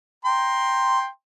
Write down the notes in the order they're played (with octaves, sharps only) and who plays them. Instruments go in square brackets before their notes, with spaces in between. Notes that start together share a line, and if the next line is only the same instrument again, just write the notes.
[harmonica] G5 A#5 C6